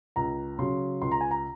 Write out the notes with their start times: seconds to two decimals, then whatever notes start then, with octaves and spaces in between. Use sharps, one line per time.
0.16 C#2 A#5
0.59 C#3 F#3 C6
1.02 C#2 C6
1.11 A#5
1.21 G#5
1.31 A#5